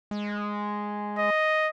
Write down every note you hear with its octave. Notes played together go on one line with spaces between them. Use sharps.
G#3
D#5